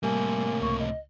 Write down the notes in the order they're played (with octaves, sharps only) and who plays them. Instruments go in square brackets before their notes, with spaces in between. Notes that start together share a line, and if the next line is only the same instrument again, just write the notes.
[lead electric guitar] A2 C3 [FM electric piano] G3 [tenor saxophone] A#3 [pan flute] G#5
[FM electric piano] C#2 [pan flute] C#6
[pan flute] D#5